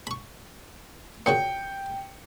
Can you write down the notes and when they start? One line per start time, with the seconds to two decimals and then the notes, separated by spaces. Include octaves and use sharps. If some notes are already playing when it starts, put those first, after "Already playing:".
0.07 B5 C#6
1.26 A#2 C#3 F#4 G5 C#7